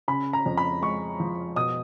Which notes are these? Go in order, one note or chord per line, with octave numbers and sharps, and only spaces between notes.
C#3 B5
A#5
F2
B5
G#3 C#6
F3
B2 D#6